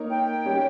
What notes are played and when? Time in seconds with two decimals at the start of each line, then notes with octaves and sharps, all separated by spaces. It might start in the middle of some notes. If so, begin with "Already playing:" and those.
Already playing: A#3 D#4 A#4 C#5
0.10 G5
0.45 G3 C#4 G4 C#5